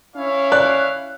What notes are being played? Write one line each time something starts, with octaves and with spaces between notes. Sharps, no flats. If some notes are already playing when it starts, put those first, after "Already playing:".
C#4 E4 C#5 F5
D5 F#6